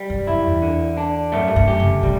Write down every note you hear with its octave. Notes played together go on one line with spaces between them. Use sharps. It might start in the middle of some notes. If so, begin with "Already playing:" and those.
Already playing: G3
F#2
F#2 E4
E2
D3
D4
F#2 A3
G2
F#2
G4
C#3
C#3 G3